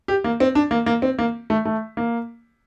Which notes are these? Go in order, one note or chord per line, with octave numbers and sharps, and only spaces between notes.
G4
A#3
C4
D4
A#3
A#3
C4
A#3
A3
A3
A#3